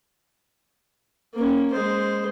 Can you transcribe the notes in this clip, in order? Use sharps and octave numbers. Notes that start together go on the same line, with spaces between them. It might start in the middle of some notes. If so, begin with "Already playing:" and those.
A#3 C#4
G#3 C5